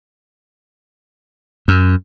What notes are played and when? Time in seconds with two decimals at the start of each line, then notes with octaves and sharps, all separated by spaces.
1.68 F#2